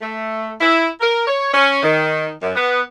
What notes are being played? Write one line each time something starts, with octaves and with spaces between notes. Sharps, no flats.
A3
E4
A#4
C#5
C#4
D#3
F#2
B3